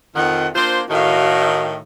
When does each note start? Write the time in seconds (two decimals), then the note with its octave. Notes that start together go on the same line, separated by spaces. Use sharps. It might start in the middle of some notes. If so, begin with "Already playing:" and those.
0.16 F2 D#3 F#5
0.55 A#3 D4 F4 C5
0.90 A2 D#3 F#4 F5